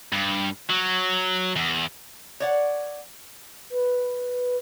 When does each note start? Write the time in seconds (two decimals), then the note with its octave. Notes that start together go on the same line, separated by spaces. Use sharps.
0.13 G2
0.70 F#3
1.56 E2
2.40 C#5 D5 F#5
3.70 B4